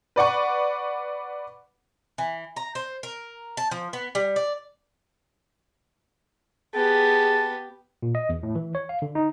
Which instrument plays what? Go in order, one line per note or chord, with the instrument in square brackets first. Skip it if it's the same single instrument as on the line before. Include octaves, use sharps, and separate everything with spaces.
[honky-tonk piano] B4 D5 F#5 C#6
[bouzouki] E3
A#5
C5
A#4
A5
F3
B3
G3
D5
[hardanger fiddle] B3 G4 [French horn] G#4 [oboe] A5
[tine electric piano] A#2
D#5
E2
A2
E3
C#5
F5
D3
D#4